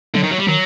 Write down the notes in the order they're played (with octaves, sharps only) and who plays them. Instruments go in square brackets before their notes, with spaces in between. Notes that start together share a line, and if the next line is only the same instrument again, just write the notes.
[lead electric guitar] D3 [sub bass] F#3
[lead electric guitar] D#3
F#3
G3
[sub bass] D#3 [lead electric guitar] F#3